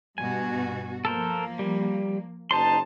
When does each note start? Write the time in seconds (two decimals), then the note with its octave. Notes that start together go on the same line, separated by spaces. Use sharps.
0.18 G2 B2 F#4 G#5
1.05 F3 A#3 A4 A#4 C5
1.59 G3
2.51 F#1 D#4 C5 A5 C6